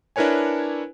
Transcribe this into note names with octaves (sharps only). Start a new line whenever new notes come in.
D4 E4 A#4 B4 C#5 G#5